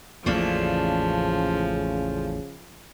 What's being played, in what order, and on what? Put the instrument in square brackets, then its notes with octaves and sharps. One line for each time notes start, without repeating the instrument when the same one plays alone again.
[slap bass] A1 E2 A2 [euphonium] C#3 [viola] F3 [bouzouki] A3 A#3 D4